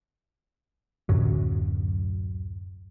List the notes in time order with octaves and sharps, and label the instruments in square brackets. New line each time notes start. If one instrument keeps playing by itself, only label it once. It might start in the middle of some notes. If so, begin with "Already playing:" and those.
[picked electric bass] D1 F#2 F#3